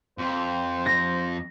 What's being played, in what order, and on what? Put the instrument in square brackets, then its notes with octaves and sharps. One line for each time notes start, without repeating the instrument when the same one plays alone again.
[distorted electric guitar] F2 [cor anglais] C5
[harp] A#6